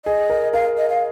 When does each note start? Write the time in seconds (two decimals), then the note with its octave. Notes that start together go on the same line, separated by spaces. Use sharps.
0.05 G#4 D#5
0.30 A#4
0.53 A#4 F5
0.77 D#5
0.90 F5